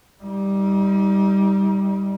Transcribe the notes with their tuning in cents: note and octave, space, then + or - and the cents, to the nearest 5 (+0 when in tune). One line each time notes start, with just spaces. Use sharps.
G3 +0 D#4 +35